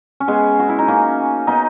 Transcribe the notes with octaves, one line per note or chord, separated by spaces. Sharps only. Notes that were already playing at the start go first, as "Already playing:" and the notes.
C#4
G#3 B3
F#4
E4
D#4
A#3 C#4
B3 D#4